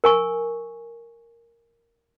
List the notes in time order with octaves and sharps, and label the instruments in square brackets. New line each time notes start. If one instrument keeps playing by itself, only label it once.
[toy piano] A#4 G#5 C#6